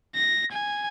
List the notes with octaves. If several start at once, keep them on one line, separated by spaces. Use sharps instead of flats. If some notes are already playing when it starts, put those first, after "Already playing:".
A#6
G#5